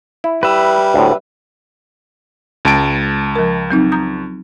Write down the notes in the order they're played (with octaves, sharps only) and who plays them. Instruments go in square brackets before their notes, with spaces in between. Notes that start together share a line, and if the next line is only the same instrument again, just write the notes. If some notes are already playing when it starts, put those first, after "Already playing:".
[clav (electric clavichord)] E4
[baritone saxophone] G3 [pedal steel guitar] B4 E5
[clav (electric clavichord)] D2 A2
[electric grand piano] C#2 A5 D7 [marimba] G#3
[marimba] F3 A#4
F#3 C4 D#4
A#5 D#6 G6